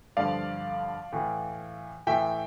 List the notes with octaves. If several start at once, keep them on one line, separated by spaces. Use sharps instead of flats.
G2 D3 F3 D5 F5
A2 E3
A2 E3 E5 G5